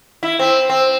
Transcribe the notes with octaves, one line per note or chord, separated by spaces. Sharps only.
E4
C4
C4